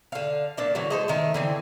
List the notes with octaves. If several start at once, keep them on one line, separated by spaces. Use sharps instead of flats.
D3 F5
A#2 D4 A5
D3 E3 F#3
G#3 A4 C5
D#3 A3
D3 E3 C4